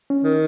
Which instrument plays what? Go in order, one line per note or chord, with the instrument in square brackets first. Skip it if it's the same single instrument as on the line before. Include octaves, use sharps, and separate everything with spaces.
[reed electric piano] C#4
[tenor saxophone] D#3